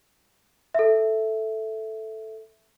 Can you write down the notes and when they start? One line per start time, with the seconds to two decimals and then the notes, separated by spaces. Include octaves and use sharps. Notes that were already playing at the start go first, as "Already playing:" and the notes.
0.75 A4 E5